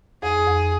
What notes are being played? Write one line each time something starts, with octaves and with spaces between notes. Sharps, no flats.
F2 G#4
F2